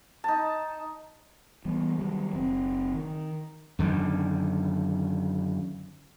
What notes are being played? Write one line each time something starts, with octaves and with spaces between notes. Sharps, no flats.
D#4 A5
E3 G3 B3
D#3 F#3 G3
F#1 C4
D#3
F#2 D3 D#3